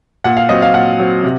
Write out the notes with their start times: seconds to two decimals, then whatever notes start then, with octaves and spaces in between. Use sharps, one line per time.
0.24 A#2 F#5
0.37 F5
0.49 F#3 C4 D#5
0.62 F5
0.74 A#2 F#5
0.99 F#3 C4
1.24 C3